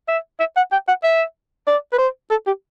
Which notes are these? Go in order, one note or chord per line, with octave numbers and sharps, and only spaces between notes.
E5
E5
F#5
G5
F#5
E5
D5
B4
C5
A4
G4